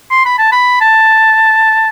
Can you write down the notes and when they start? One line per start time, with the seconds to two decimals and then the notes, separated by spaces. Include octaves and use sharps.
0.10 C6
0.25 B5
0.38 A5
0.52 B5
0.81 A5